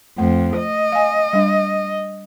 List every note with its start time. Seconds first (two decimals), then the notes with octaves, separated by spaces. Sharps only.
0.18 F2 A3
0.58 D#5
0.92 F5 G#5
1.33 G3 D4